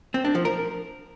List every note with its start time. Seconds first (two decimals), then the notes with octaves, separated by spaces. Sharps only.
0.14 C4
0.25 D4
0.35 F3
0.45 A#4